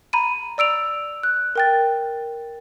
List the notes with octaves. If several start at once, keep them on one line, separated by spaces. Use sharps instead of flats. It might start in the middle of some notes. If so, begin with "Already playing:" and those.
A#5 B5 D#7
D5 E6 D7 F7
F#6
A#4 G5 A6